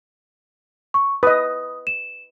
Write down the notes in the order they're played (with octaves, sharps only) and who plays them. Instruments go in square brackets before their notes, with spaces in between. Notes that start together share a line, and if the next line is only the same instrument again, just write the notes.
[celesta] C#6
[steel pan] B4 D#5 [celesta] D#6
[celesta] E7